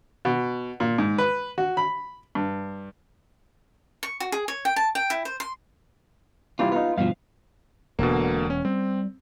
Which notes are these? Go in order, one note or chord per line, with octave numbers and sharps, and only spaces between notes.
B2
A#2
G#2
B4
F#4
B5
G2
C#6
F#4
G#4
C#5
G5
A5
G5
E4
C5
C6
C3 E3 G3 F4
B3 D#4 F4
G2 B2 F3 F5
E1 B2 D3 A#3
C#4
G3 C4